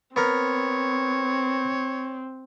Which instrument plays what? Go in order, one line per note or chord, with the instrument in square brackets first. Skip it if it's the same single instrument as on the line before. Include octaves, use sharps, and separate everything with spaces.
[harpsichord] B3 A#4 [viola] C4 [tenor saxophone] C#5